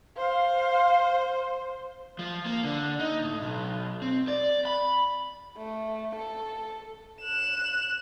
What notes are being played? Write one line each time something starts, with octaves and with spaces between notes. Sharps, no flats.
C5 F5
F3
A#3
D3
D#4
A2
B1
C4
D5
B5
A3
A4
F#6 E7